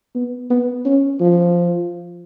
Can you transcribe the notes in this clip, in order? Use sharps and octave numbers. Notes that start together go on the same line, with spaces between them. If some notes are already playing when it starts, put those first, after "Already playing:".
B3
B3
C#4
F3